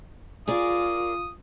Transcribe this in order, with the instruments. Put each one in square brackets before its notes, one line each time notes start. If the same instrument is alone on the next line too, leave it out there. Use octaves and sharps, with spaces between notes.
[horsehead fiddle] F4 [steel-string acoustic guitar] G#4 A#4 D5 [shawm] D#6